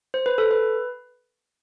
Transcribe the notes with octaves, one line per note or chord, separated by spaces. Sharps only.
C5
B4
A4
B4